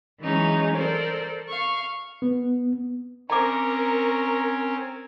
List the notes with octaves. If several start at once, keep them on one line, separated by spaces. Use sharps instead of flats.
E3 F#3 G#3 C#4 D#4
A4 A#4 C5 D5
F5 C#6
B3
C4 C#4 A#4 C#5 A#5 D6